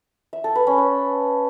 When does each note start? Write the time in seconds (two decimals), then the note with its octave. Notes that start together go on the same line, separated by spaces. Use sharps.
0.33 E5
0.44 A4
0.55 B4
0.67 C#4
0.78 B4